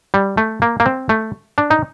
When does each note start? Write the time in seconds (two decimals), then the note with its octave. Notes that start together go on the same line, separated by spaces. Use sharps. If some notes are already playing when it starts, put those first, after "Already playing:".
0.14 G3
0.37 A3
0.62 A#3
0.80 A#3
0.86 C4
1.09 A3
1.58 D4
1.70 D#4